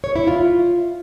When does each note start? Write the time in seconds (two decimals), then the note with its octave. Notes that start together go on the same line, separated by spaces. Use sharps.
0.04 C#5
0.16 E4
0.27 F4